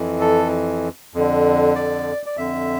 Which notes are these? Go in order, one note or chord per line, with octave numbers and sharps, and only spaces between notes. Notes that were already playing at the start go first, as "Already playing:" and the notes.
Already playing: F2 E3
A4
F2 D3
D5
D5
F2 D3 E5